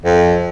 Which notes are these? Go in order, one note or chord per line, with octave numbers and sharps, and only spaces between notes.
F2